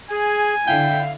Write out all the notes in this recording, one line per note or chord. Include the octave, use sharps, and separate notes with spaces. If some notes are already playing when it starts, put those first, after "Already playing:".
G#4 G#5
D3 E4 F5 G5